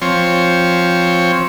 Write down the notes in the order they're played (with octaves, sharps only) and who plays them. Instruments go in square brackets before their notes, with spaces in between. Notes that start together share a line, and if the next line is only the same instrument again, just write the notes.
[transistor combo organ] F3 C4 C#5